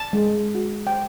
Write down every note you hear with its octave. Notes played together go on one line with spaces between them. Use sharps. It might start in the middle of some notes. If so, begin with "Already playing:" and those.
Already playing: A5
G#3
F#4
G5